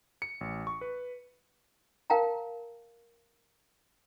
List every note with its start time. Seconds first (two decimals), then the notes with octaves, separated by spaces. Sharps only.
0.22 C#7
0.41 A1
0.67 C#6
0.81 B4
2.10 A#4 F5 G5 A5 A#5